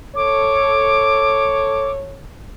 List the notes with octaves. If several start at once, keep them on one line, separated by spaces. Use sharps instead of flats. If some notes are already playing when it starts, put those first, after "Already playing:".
A4 C#5 D6